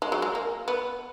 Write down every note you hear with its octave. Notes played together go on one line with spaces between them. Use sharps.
G#3
F#3
G#3
A#3
B3